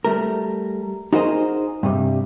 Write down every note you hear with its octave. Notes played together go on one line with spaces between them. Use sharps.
G3 A3 A#4
D#4 F#4 G#4 A#4 C5 D#5
G2 C3 G3